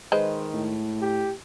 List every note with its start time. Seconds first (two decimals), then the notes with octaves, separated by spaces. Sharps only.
0.12 D#3 G#3 B4 C5
0.54 A2
1.01 G4